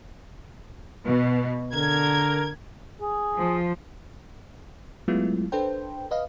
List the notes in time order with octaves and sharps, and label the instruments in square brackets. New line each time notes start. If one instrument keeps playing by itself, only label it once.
[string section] B2
[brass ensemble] D3 A#4 [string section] G#6
[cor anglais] G#4
[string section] F3
[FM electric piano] F#3 G#3 A3 B3 E4 F4
D4 A4 B4 C5 G5
B4 D#5 F5